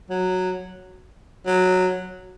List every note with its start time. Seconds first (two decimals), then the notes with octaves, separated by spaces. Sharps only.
0.10 F#3
1.46 F#3